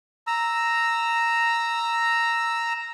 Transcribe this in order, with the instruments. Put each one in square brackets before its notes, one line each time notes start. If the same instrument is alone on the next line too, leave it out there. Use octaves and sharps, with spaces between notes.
[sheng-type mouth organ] A#5 E6